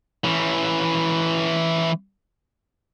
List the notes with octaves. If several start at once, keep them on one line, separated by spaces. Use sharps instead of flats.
E3 C#4